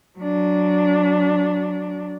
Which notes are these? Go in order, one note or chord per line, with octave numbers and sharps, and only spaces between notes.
F#3 D4